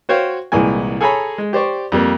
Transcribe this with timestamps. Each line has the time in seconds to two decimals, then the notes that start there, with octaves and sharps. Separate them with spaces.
0.09 F#4 C5 C#5 F5 G5
0.52 C2 A#2 E3 G#3 G#5
1.01 G#4 A4 C#5 G#5 A#5 B5
1.38 G#3
1.53 G4 C5 D5 C#6
1.92 F2 G3 A#3